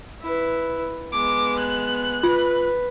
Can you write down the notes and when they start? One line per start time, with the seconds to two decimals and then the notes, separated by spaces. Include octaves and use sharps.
0.22 E4 B4
1.13 G#3 B3 D6
1.59 F#6
2.23 F4 B4